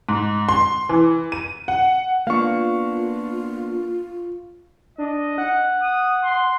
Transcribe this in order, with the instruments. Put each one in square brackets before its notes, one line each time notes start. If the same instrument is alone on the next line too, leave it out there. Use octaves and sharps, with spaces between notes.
[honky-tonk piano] G#2
C6
E3
D#7
F#5
[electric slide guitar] A#3 B3 D4 [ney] F4 [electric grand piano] F5 C#6
[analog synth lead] D4 [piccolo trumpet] D#5
[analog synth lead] F#5
[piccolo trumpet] D#6
C6